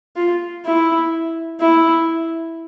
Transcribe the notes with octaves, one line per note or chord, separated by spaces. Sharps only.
F4
E4
E4